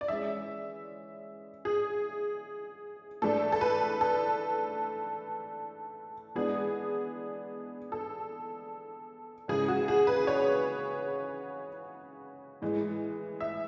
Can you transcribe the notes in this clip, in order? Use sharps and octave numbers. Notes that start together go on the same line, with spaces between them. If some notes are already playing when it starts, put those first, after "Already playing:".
D5
E3 G#3 C#4 E5
G#4
A2 E3 A3 D4 A4
A4
B4
A4
E3 G#3 B3 D4 G#4
A4
C#3 E3 G#3 G#4
F#4
G#4
B4
C#5
A2 E3 G#3
E5